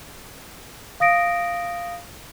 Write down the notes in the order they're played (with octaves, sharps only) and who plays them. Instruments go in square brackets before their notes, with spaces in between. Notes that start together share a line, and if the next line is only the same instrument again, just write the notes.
[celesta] F5 D#6 A#6 D7